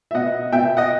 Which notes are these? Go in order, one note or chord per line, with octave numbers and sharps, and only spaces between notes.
E5
B2 D#5 F#5
B2 E5 G5
D#5 F#5